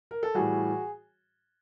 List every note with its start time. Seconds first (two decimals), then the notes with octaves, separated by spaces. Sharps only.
0.11 A#4
0.23 A4
0.34 A2 E3 G3 F#4 G#4